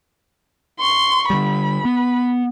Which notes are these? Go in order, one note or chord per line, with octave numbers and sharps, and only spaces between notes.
C6 C#6
D3 G3 B5
B3